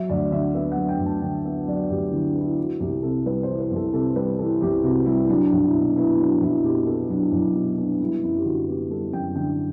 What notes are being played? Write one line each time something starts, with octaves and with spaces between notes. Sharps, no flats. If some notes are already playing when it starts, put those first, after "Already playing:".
Already playing: F#3 E5
D2 D5
D3 E5
B3 E5
F#3 F#5
G5
D2
A5
D3 G5
B3 E5
F#3 D5
D2 G4
E4
D3
D4
B3
E4
E3 F#4
C2 G4
C3 A4
G3 B4
E3 C5
B4
C2 A4
C3 A4
G3 B4
E3 A4
C2 G4
C3 F#4
G3 E4
F#3 D4
D4
B1
E4
B2 D4
B3 E4
E4
F#3 D4
B1 E4
B2 G4
B3 A4
F#3 D4
B1 E4
B2 E4
B3 D4
G3 E4
F#2 E4
G4
D3 F#4
B3 G4
G3 A4
F#2 G5
D3 G5